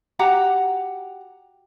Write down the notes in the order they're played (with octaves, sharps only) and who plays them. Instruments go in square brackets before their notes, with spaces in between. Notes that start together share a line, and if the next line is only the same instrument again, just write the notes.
[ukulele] F#4 G4 F#5 A#5